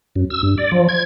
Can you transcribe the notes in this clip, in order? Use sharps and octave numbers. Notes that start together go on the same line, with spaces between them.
F#2
E6
G2
D5
F3
G#6